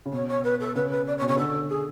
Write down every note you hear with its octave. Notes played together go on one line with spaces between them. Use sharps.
C#3
B2 C#5
C#5
B4
A4
C#3 B4
B4
D5
C#5
B2
C#3 C#5
D3 A4
G#4